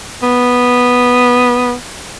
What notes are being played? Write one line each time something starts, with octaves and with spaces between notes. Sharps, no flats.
B3